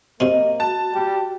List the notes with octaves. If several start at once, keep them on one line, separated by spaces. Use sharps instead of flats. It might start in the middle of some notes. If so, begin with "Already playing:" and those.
F#2 C3 A#3 C4 D#5
F#4 A5
G3 G4